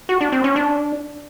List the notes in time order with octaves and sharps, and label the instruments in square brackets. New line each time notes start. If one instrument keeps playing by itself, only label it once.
[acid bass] F#4
D4
C4
C#4
D4